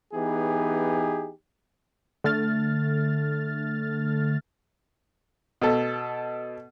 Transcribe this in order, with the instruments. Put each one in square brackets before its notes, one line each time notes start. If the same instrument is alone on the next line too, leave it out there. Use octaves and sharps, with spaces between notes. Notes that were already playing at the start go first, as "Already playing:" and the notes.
[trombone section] E3 B3 D#4 G4 G#4
[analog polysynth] D3 A3 F6 A6
[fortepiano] B2 A4